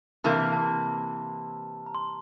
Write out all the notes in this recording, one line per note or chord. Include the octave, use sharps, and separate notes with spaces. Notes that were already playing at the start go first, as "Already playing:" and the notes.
C3 E3 A#3 A5
A5
A#5
C6